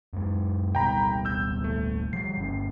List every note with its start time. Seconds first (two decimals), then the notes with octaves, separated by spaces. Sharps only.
0.13 F#2 G#3
0.75 D1 B2 G3 G5 A#5 B5
1.25 E6 G6
1.64 A3
2.13 F3 G3 C7
2.38 G1 C#4